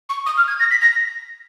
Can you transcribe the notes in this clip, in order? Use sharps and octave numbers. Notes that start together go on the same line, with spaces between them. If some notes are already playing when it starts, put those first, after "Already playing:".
C#6
D#6
F6
G#6
A#6
B6
A#6